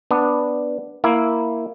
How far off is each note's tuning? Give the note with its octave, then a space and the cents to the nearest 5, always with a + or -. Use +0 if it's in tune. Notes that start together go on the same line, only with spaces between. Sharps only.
B3 +0 D4 +0
A#3 +0 E4 +0